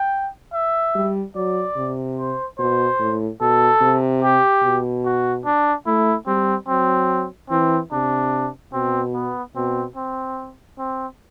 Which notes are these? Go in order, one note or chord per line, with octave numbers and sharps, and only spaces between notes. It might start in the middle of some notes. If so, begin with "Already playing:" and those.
Already playing: G5
E5
G3
F#3 D5
C3
C5
B2 C5
A2
B2 A4
C3
G4
B2
F#4
D4
A3 E4
G3 C4
F#3 C4
E3 C4
C3 D4
B2 C4
B3
B2 C4
C4
C4